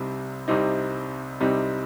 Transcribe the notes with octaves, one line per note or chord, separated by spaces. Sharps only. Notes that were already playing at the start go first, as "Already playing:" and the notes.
Already playing: C2 C3 G3 C4 D#4
C2 C3 G3 C4 D#4
C2 C3 G3 C4 D#4